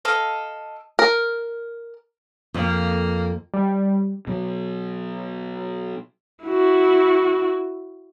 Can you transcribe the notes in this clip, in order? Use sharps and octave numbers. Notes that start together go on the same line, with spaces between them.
A4 D#5 F5
A#4
F2 A#3
G3
B2 F#3
E4 F#4